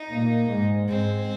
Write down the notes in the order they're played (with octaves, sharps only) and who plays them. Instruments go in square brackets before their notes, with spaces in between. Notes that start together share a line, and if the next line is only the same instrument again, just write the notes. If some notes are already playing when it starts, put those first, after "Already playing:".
Already playing: [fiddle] D#4
[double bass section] A#2 A#3
G#2 G#3
[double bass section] G#2 G#3 [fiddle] C4